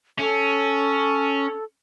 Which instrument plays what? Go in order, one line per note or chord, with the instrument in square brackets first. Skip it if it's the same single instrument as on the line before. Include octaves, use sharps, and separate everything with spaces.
[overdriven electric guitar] C#4 [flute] A4